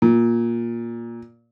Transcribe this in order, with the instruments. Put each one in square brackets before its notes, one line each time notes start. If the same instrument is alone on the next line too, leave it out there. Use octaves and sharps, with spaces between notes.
[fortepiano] A#2